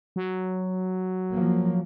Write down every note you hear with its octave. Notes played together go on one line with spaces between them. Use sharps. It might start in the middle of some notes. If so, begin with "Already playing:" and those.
F#3
F3 A#3